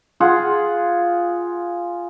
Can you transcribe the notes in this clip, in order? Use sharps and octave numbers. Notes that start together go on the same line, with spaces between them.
F4 G#4 F#5